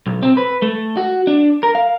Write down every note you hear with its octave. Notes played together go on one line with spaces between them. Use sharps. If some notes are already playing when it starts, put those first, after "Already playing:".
B1
C4
B4
A3
F#4
D4
A#4
F5